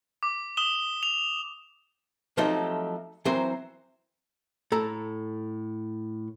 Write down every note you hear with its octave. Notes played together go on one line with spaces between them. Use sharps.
D6
D#6 E7 G7
F7
F3 F#3 A3 C4 D#4 G4
E3 F#3 C4 A#4 C5
A2 A4 A#5